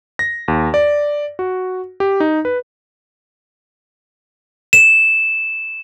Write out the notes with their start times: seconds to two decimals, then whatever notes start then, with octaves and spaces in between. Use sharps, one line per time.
0.19 A#6
0.48 D#2
0.74 D5
1.39 F#4
2.00 G4
2.20 D#4
2.45 B4
4.73 E7